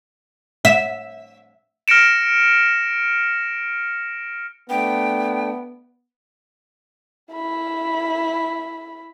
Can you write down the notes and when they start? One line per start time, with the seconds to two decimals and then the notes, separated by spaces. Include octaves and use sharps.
0.65 E5
1.88 F6 A#6 C#7 D7 E7
4.70 A3 B3 D4 G5
7.32 E4 B5